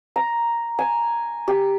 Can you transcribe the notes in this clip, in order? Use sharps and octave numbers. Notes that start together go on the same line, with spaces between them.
A#5
G#5
G4